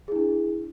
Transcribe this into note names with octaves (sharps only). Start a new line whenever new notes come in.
D4 E4 G#4